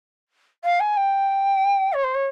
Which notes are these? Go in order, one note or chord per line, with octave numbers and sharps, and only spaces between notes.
F5
G#5
G5
C#5
C5
C#5